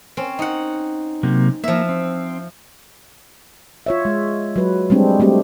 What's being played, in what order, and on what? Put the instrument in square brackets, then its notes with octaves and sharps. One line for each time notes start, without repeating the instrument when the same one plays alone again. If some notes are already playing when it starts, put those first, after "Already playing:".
[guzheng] C4 C#4
D#4 F#5
[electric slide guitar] C3 F#3 A#3
[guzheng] F3 E5 [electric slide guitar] A#3
[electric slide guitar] C4
[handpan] F4 C#5 E5
G#3
F#3 B4
G3 G#3 C4 D4
G3 A3 C4 G4